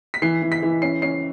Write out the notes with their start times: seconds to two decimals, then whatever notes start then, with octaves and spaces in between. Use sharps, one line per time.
0.14 B6
0.22 E3 C7
0.42 E3
0.52 B6
0.63 E3
0.82 C#4 C7
1.02 C#4 C7